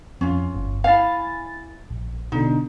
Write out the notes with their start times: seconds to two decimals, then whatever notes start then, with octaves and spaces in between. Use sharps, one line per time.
0.21 F2 C#4 F4
0.54 G1
0.84 E4 F5 G#5 A6
1.90 A#1
2.32 B2 D3 D#4